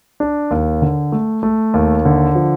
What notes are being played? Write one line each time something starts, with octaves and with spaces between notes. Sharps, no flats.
D4
D#2
D3
A3
A3
D#2
D3
F3